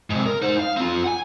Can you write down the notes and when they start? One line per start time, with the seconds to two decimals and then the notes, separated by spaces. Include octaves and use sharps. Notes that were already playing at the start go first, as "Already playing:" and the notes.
0.10 G#2 C3
0.26 A#4
0.42 D#4 C5
0.59 F5
0.77 C4 F4
1.04 F#5 G#5